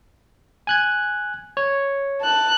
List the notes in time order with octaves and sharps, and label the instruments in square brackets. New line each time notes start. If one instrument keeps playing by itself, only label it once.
[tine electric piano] G#5 F#6 G#6
C#5
[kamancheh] A5 F#6